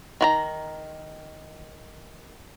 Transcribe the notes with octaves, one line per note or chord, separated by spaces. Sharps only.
D#3 F#4 A#5